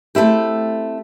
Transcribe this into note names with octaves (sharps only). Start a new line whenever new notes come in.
A3 C4 E4 G4